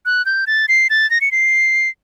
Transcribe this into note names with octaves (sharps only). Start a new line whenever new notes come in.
F#6
G6
A6
C7
A6
A#6
C#7
C7